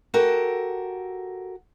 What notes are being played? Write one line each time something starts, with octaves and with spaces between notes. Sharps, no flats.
F#4 G4 A4 A#4